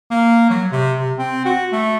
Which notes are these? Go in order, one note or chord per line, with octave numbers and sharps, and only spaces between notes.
A#3
F#3
C3
C3
C4
F#4
A3